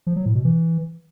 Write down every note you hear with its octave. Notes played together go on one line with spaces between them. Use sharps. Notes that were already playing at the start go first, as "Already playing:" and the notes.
F3
F#3
A2
B2
E3